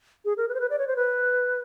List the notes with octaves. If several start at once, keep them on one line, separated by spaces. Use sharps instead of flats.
G#4
A#4
B4
C5
B4
D5
C#5
C5
B4